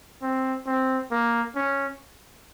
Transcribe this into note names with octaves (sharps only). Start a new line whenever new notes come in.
C4
C4
A#3
C#4